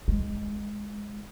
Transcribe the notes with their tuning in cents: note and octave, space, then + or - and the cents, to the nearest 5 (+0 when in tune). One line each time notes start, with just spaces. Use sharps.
G#3 -5